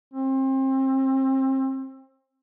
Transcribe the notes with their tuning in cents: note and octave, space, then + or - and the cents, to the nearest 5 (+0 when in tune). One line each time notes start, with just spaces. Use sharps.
C4 +30